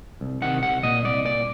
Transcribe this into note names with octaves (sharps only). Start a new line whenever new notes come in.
C2
C3 D#3 F#5
C2 F#5
A#2 D#5
C2 D5
A#2 D5